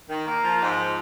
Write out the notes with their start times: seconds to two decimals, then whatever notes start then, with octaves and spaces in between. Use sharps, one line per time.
0.09 D#3
0.26 A#3
0.44 F3
0.59 G#2
0.76 F3